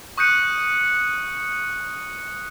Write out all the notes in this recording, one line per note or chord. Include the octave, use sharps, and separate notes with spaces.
C#6 D#6 F#6 G6 C#7 D#7